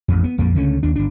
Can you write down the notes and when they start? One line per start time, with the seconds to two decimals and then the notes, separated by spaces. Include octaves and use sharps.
0.08 A1 F2
0.24 B3
0.38 A#1 F2 F3 A#3
0.55 C#2 D3 A3 C#4
0.83 D#2 D4
0.96 G1 D4